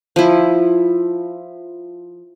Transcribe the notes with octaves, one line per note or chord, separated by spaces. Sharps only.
F3 E4